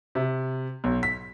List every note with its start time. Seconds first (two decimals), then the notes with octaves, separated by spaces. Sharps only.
0.15 C3
0.84 B1
1.03 B6